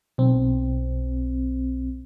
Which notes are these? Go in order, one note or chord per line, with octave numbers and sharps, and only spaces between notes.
B1 C4